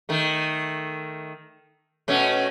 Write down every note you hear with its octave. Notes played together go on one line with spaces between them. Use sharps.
D#3 A3
B2 A3 C#4